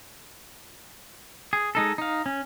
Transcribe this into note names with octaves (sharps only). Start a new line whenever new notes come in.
G#4
G#3 D#4 A4
D#4 F5
C#4